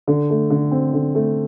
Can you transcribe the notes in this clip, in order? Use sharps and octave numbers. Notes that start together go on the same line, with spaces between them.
D3
A3
D3
C4
D3
A3